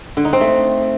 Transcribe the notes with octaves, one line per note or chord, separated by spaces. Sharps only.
D3
D#4
C4
A3